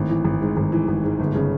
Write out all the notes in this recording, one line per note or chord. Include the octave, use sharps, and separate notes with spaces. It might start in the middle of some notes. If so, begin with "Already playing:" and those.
Already playing: G#1 A2
E3
G#1
G#2
G#1
E3
G#1
G#2
G1
C#3